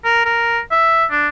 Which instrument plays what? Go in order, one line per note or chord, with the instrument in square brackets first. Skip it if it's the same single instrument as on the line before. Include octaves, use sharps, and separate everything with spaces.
[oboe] A#4
A#4
E5
D4